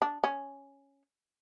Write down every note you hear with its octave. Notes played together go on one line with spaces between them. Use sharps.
D4
C#4